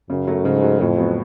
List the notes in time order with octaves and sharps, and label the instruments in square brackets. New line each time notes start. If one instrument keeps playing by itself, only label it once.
[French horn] F#2 [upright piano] C#3
[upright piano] F#3 A3
[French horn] G#2 [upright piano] C#3
[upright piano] F#3 A3
[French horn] F2 [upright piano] A2
[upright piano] F#3 B3 F#4